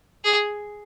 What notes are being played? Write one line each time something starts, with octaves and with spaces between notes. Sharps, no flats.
G#4